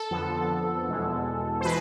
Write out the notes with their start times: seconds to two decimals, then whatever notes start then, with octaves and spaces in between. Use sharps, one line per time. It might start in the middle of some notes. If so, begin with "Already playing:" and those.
Already playing: A4
0.11 F2 D3 F3 B3
0.88 E2 B2 G#3
1.60 C5
1.65 E3 G#3 B4